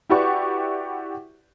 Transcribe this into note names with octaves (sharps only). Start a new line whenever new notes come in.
E4 F#4 G4 B4 D5 C#6